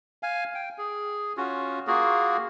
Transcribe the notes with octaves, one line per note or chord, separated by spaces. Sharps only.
F5 G#5
G5
G#4
C#4 F4 F#4
A#3 F4 F#4 G#4